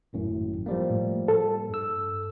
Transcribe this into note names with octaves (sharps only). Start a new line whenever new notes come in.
G#1 F#2 A2
F3 G3 A#3
A2
A4
G2 E6